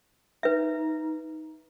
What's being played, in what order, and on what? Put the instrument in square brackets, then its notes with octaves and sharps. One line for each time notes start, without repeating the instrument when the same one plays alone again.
[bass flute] D#4 [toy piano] B4 E5